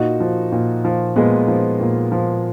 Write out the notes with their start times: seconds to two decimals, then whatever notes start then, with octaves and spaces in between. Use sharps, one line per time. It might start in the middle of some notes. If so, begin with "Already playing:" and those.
Already playing: A#2 D#4 F#4
0.20 F3
0.52 A#2
0.85 F3
1.16 A#2 G#3 B3
1.48 F3
1.80 A#2
2.12 F3